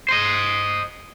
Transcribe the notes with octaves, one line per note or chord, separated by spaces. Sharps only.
C5 D#5